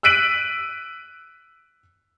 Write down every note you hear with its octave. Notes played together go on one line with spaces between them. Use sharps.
E6 F#6 B6 D7 D#7 F#7